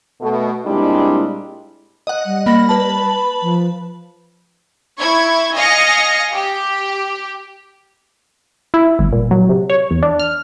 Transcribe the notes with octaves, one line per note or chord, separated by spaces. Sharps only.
B2 A3
A#2 G3 G#3 C4 D4 E4
D#5 F#5
G3
A#3 B5 A#6
B4 A5
F3
E4 C#6 G#6
D#5 F5 G#5 A#6 C#7
G4
E4
G1
A#2
F#3
C3
C#5
E2
D4
F6